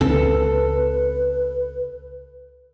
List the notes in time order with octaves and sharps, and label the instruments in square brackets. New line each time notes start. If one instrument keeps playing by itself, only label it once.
[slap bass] C#2 C#3 C4 [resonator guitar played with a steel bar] A4 [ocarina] B4